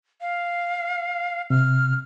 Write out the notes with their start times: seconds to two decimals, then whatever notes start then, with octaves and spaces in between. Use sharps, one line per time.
0.21 F5
1.50 C3 F6